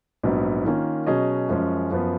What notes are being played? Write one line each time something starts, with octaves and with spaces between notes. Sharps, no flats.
A#1 G#2 F#3 B3
D#3 A#3 C#4 F4
B2 F#3 C#4 G#4 D#5
F#2 F3 G#3 C#4
F#2 F3 B3